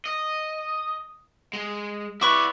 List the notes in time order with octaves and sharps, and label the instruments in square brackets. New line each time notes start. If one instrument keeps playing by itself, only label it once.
[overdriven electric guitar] D#5
G#3
[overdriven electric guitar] E4 D5 [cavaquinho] B4 C#6 D6